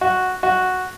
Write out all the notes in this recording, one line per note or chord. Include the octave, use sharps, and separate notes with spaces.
F#4
F#4